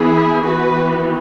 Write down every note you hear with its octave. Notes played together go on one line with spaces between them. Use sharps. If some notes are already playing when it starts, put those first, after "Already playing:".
Already playing: E3 B3 E4 G#4
E3 B3 F#4 B4